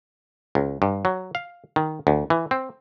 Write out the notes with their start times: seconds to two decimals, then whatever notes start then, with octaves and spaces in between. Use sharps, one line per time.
0.55 C#2
0.82 G2
1.05 F#3
1.35 F5
1.76 D#3
2.07 D2
2.30 E3
2.51 C4